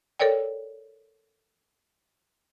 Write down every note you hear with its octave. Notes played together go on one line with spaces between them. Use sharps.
A4 A#4 C#5 D5 G5